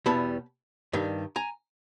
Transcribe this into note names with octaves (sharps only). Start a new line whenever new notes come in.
E2 B2 G3 B3 E4 A5 B5
G2 D#3 G3
G#5 A#5